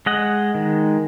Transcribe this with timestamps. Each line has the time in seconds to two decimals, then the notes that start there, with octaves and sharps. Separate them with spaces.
0.06 G#3 D#5 F#5
0.55 D#3